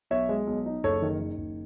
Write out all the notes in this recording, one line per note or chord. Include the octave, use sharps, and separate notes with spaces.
B1 C#5 E5
G#3
B1
D#4
F#1 A4 C#5
D#3
D#3
F#1